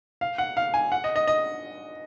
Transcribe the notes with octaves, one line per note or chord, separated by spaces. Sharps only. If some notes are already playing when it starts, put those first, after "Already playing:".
F5
F#5
F5
G#5
F#5
D#5
D#5
D#5